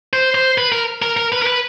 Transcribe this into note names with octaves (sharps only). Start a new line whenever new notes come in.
C5
C5
B4
A#4
A#4
A#4
B4
A#4
B4